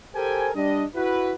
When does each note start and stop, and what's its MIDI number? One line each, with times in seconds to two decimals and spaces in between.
0.15 0.50 67
0.15 0.50 69
0.15 0.50 70
0.15 0.50 72
0.15 0.50 79
0.15 0.50 80
0.55 0.84 55
0.55 0.84 62
0.55 0.84 75
0.95 1.33 64
0.95 1.33 66
0.95 1.33 71